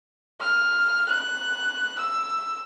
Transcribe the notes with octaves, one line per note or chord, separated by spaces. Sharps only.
F6
F#6
E6